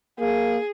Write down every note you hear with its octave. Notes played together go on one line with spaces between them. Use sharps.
A#3 G#4